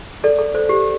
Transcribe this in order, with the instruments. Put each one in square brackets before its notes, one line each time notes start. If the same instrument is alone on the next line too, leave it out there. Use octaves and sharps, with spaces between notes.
[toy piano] A4 [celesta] D5
[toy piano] A4
[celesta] A4 [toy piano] C5
[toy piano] G4